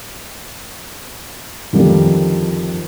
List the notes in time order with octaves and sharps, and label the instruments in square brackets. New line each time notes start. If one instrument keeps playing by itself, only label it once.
[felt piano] F2 D3 D#3 F3 G3